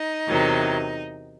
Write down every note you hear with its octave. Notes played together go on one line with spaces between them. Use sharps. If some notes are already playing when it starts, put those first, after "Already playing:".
Already playing: D#4
E2 C3 D#3 F#3